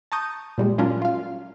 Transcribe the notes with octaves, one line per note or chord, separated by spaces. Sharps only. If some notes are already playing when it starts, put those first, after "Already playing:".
A5 A#5 C#6 D#6 G6
A#2 G3 G#3
F#3 C#4 D4 F4 A#4
F4 F5